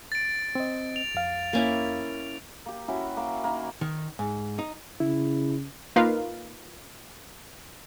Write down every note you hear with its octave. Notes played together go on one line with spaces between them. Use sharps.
A6 D7
C4 D#5
F7
F2 F5
A#3 C#4 E4
A#3 G4
C#4 E4 F#4 F#5
A#3
D#3 A#3
D#3
G#2
D#4
C#3 E4
A#3 D#4 F4 A#4 B4 F5